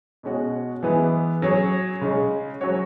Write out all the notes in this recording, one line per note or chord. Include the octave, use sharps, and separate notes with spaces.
B2 G#3 C#4 F#4
E3 G#3 B3 G#4 B4
F#3 C#4 G#4 C#5
C#3 G#3 C#4
F#3 C#4 F#4 C#5